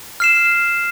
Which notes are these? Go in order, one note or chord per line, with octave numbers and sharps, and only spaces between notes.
F6 C7 E7